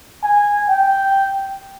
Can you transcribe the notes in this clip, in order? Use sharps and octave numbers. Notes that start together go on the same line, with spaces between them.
G#5
G5